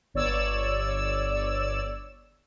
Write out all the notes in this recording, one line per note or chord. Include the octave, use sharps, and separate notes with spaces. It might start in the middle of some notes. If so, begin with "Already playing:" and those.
G1 C#5 D5 E6 E7